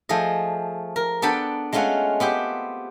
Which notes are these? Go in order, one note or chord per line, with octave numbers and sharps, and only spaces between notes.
F3 A3 G#4 D#5
A#4
B3 D4 A4 G5 A5 B5
G#3 A3 C#4 F4 F#5
B3 C4 G4